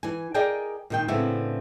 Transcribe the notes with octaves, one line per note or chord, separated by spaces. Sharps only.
E3 G#5
G#4 A#4 D5 D#5 G5 G#5
A#2 D#3 G5
A2 C#3 B3 C4 D4 E4